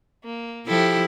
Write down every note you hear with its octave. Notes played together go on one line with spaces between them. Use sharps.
A#3
F3 E4 G4 A4